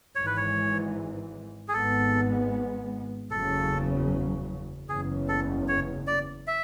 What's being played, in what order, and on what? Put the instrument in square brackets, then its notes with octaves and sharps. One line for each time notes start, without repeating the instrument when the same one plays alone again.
[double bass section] G#1 G#2 E3 [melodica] C#5
[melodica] B4
C#5
G#4
[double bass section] G#1 G#2 G#3 B3 [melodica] A4
[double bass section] F#1 E2 C#3 F#3 [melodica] A4
[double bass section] F#1 E2 C#3 [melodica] G#4
[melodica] A4
C#5
D5
E5